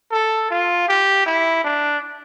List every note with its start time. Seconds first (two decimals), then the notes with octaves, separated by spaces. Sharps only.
0.12 A4
0.50 F4
0.88 G4
1.26 E4
1.64 D4